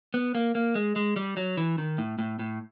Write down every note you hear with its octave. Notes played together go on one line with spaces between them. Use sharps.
B3
A#3
A#3
G#3
G#3
G3
F#3
E3
D#3
A2
A2
A2